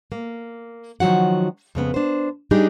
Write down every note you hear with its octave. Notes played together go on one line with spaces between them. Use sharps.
A#3
D#3 F3 F#3 F#4 F#5
F2 C#3 B3
D4 C5
G3 D4 D#4 G4 G#4